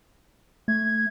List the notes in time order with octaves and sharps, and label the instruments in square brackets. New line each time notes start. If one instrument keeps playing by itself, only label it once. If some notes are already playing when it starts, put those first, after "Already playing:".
[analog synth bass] A3 [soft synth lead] G#6